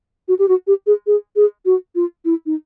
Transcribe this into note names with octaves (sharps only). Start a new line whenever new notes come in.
F#4
G4
F#4
G4
G#4
G#4
G#4
F#4
F4
E4
D#4